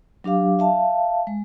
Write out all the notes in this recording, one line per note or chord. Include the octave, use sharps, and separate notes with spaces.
F#3 D4 G4 F5 D6
E5 F5 A5
G#3